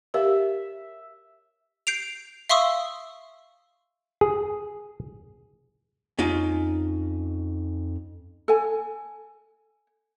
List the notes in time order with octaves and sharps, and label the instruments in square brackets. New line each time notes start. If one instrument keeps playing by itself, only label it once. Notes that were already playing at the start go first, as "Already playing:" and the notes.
[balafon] G4 A#4 F5 [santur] E5
[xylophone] G6 C7 D7 F7
E5 F5 C6 C#6 D#6 E6
[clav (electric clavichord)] G#4
[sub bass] F2 [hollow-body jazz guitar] C#4 D#4 F4
[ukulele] A4 G#5